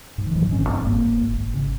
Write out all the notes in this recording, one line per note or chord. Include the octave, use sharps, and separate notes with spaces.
G#2
D#3
G#2 F3
D#3
G#1 C#4
C4
G#2
C4
G#1 A#3
G#1
G#1
G#1
C#3